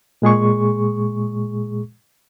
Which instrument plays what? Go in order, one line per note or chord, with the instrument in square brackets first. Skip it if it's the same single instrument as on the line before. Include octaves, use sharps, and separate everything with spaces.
[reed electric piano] A#2 G#3 G#4 C#6